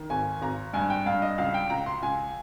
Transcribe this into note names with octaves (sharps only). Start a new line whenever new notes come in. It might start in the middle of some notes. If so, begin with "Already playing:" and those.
Already playing: D#3
G#1 G#5
G#1 A#5
G2 G#5
G5
G2 F5
D#5
C#2 F5
G5
C#2 A#5
C6
C#2 G#5